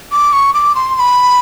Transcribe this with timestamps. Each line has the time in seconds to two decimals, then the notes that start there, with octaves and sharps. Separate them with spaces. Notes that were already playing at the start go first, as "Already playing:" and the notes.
0.12 D6
0.33 C#6
0.54 D6
0.75 C6
0.95 C6
1.00 B5